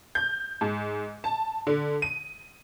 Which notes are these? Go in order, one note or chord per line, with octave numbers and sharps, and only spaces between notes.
G6
G#2
A5
D3
D#7